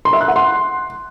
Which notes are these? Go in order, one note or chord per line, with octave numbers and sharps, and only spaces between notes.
C6
E5
F#6
F#5
C6